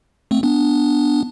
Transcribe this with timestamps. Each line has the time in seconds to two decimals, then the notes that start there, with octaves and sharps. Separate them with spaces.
0.31 A3 C4
0.43 B3 D4